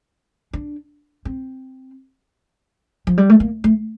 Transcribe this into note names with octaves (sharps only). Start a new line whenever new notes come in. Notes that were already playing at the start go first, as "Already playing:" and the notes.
D4
C4
F3
G3
A3
A#3
A3